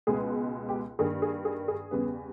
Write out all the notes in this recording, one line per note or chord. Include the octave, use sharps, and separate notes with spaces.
C#2 B2 G#3 B3 G#4
G4
G2 D#3 A#3 G#4
G#4
G#4
G#4
E2 C#3 G3 B3